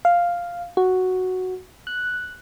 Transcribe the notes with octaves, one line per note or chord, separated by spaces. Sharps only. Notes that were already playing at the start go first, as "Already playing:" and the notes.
F5
F#4
F#6